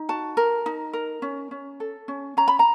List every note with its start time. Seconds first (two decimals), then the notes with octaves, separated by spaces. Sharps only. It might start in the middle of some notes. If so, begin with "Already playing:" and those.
Already playing: D#4
0.09 F#4 A5
0.37 A#4
0.66 D#4
0.93 A#4
1.22 C#4
1.51 C#4
1.80 A4
2.08 C#4
2.37 C#4 A#5
2.48 B5
2.59 A#5